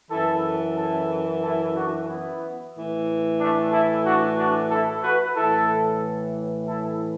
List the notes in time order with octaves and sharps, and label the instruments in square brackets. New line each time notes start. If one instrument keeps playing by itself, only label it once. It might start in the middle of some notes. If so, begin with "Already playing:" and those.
[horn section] F#2 E3 E4 A4
E4 A4
E4 A4
D4 F#4
B3 E4
A2 E3
A3 D4
E4 A4
D4 F#4
D4 F#4
E4 A4
F#4 B4
A2 E3 E4 A4
E4 A4